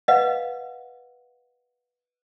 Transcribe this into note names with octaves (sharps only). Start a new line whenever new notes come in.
B4 D#5 F5 F#5